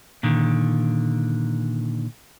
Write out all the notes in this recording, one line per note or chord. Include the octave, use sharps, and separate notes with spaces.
A#2 D3 D#3